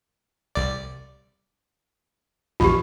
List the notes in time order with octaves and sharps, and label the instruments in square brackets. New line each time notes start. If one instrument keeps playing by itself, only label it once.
[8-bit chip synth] C2 D5
[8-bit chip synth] A#1 E2 G#2 [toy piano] F4 G4